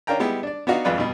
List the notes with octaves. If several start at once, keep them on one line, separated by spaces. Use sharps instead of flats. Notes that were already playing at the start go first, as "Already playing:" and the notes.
C#4 D4 A#4 F5 G5 A#5
G3 G#3 B3 E4 G4
D4 D5
B3 D4 D#4 F#4 F5
G#1 F2 F4 B4 D5
G2 B2